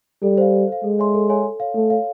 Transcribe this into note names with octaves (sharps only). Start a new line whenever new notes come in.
G3 A4
C5 F5
A4
C5 F5
G#3 A4
C#5 E5 G#5 C6
A4
C#5 E5 G#5 C6
A4
C#5 F5
A3 A4
C#5 F5